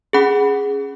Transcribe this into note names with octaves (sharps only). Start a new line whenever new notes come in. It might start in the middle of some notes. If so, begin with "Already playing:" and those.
C#4 G#4 F#5 B5